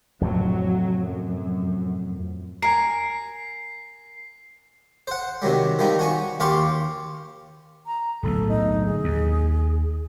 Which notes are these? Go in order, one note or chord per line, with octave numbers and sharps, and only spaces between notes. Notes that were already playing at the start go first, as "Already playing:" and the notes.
F2 A2 C3 F#3
F#2
A#4 G#5 C7
C5 F#5
C3 D#3 F#3 G3
D#3 F3 G3 D#4
F#4 G#5 C#6
D#2 F4 G4 F5 C6 C#6
A#5
D1 B1 B2 A4
D#4
G#4
D#2